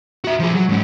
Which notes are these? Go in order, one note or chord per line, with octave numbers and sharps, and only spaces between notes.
F#4 E5
F3 G#4
F#3
G#2 C#4